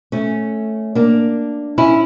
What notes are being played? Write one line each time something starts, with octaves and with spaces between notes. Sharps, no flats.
A3 C#4
A#3 D4
C#4 E4